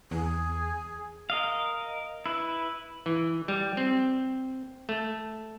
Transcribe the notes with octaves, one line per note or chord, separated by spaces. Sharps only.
E2 G#4
A#4 D#5 F5
E4 B4
E3
G3
C4
A3